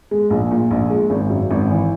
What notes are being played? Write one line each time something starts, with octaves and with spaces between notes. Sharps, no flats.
G#3
A#1
A#2
A#1
G#3
G#1
F#2
G#1
E3